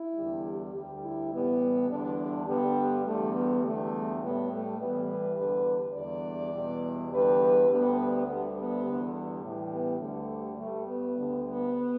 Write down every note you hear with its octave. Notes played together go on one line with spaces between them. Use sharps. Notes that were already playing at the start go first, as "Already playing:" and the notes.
Already playing: E4
E2 D3 G3
G4
D2 D3 G3
E4
A2 E3 G3 B3
E2 D3 G3 D4
G2 D3 G3 B3
E2 D3 G3 A3
B3
E2 D3 G3 A3
A2 G3 B3
A3
A2 E3 G3 B3
B4
E2 D3 G3 B4
E2 D3 G3 D5
E2 B2 G3
E2 D3 G3 B4
D2 D3 G3 B3
D2 D3 G3 B3
B3
E2 D3 G3
A2 E3 G3
B3
D2 D3 G3 A3
G2 G3 A3
B3
D2 D3 G3
B3